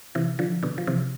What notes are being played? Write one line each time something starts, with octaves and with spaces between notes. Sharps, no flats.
C3 E3
D3 F3
B2 D3
F3
C3 E3